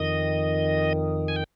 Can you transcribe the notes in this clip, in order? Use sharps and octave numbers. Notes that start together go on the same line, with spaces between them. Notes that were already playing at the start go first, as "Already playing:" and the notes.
Already playing: F2 D#3 D#5
G#5
G5